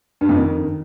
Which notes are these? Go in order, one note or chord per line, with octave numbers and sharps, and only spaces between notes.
G2
F2
D#3